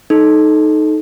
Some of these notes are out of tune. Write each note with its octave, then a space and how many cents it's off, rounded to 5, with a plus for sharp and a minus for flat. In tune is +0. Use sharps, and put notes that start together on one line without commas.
D#4 +0 A4 -20